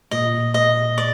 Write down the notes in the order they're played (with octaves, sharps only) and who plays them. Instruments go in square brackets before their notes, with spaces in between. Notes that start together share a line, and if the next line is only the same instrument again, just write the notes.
[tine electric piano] A#2 [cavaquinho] D#5
[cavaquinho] D#5
D5